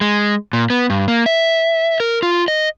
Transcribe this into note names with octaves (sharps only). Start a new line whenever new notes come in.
G#3
A#2
B3
G2
A#3
E5
A#4
F4
D#5